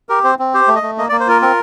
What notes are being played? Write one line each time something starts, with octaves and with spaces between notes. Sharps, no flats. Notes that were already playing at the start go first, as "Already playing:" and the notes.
G4 A#4
C4 C5
C4
G4 C5
A3
D#5
A3
A#3 D#5
D5
A#3
C5
F4 A#4
C4 A#4